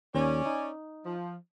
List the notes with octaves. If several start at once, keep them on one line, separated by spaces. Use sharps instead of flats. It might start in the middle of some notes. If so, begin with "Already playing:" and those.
D#2 C#4 D5
D#4
F3